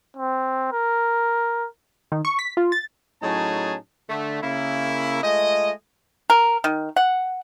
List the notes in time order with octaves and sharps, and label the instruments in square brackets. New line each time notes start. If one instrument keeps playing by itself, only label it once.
[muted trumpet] C4
A#4
[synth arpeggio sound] D#3
C#6
B6
F4
A6
[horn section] A2 F#3 C#4 D#4 G#4 A5
D3 A3
C#3 A#3 E4
G#3 A3 F4 D#5
[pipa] A#4
D#3
F#5